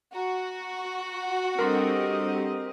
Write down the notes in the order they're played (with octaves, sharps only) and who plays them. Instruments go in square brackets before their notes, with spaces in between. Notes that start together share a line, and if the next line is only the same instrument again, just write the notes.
[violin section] F#4 [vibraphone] A#5
[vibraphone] G3 D4 A4 [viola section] C4 G4 D#5 [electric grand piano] A#4 C6